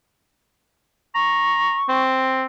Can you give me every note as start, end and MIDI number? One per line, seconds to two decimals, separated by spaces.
1.15 1.78 82
1.15 2.03 85
1.89 2.46 60